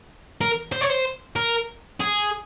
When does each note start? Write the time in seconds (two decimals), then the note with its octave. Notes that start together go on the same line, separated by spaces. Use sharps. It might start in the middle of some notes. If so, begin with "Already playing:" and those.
0.41 A#4
0.72 C5
0.81 C#5
0.90 C5
1.36 A#4
2.00 G#4